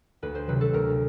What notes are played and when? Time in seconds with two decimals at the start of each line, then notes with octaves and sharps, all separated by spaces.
0.22 D2 B4
0.35 C5
0.47 C3 D#3 F#3 B4
0.61 A4
0.73 D2 A#4